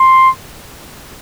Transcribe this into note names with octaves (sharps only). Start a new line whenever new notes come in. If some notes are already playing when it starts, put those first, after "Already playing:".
Already playing: C6